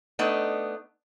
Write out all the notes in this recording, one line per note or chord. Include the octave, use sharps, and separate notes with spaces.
A3 B3 D4 D#4